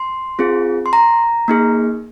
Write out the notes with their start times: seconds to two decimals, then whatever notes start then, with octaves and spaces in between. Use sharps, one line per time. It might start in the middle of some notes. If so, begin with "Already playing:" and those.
Already playing: C6
0.39 C4 F4 G#4
0.86 C6
0.93 A#5
1.48 A#3 D#4 G#4